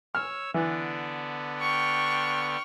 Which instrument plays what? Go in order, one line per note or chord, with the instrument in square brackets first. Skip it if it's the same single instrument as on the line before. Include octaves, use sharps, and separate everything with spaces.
[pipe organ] C#5 E6 [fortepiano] F6
[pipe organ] D3 B3 D4 [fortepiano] E3
[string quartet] G5 C#6 F6